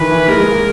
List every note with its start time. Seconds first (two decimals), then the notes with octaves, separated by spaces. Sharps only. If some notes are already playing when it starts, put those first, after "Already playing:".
Already playing: D#3 E3 B4
0.11 E3
0.28 G#3 A#4
0.40 G#3
0.51 A#3